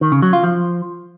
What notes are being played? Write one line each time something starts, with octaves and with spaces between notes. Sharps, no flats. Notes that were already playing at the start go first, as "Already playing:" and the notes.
D#3
C#3
F#3
F4
F3